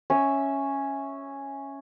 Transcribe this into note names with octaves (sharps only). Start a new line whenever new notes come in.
C#4 E5